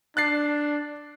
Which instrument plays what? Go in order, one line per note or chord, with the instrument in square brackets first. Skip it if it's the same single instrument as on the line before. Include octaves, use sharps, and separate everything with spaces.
[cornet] D4 [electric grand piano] F#6 A6 C7